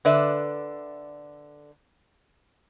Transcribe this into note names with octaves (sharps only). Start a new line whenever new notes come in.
D3 B4 D5 E5